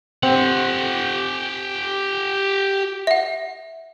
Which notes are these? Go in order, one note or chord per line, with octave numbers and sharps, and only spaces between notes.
C4 G4 F#5
E5 F#5